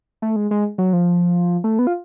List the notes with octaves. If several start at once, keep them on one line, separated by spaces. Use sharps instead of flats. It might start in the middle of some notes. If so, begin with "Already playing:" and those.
A3
G#3
G#3
F#3
F3
A3
B3
F4